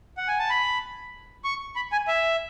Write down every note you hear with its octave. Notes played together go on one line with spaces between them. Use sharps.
F#5
G#5
A5
B5
C#6
B5
G#5
E5